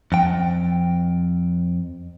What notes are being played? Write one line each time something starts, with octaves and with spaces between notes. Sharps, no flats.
F2 G5